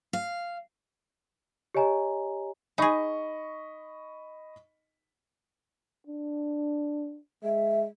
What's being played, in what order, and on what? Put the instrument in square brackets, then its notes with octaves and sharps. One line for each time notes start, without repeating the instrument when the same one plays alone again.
[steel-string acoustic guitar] F5
[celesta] G4 C#5 D#5 G#5 A#5
[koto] D#4 G#4 [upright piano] D#5 B5 C#6
[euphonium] D4
[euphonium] G#3 [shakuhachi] E5